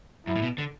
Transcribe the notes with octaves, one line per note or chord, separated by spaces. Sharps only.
F#2 E4
A2
B2
D3